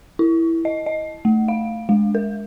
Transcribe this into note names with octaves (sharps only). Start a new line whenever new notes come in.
E4
D#5
D#5
A3
F5
G#3
A#4